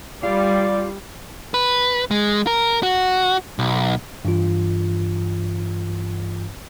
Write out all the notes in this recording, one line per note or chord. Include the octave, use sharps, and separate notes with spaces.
G3 F4 D5
B4
G#3
A#4
F#4
B1
G2 E3 F4